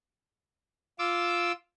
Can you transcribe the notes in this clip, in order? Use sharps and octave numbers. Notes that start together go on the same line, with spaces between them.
F4 D6 E6